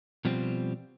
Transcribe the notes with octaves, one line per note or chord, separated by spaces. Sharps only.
B2 F3 G3 C4